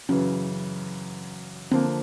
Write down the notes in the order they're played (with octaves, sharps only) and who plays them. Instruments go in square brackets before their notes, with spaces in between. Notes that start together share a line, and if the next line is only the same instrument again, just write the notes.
[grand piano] F#2 C#3 E3 [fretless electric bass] C#4
[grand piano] D3 F3 A#3 [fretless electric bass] C4